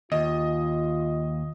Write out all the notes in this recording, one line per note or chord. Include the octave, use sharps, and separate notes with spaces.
D#2 F4 D#5